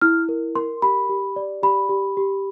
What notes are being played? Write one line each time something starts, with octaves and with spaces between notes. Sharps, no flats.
E4 F6
A#4
A#4 C6
G4 B5
G4
D5
G4 B5
G4
G4